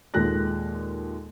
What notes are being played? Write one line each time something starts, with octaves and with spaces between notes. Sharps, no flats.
D#2 A#2 G#3 A4 F#6 A#6